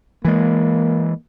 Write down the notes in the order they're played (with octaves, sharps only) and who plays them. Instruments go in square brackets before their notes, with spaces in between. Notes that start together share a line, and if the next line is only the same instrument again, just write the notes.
[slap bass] E3 G#3 [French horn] A#3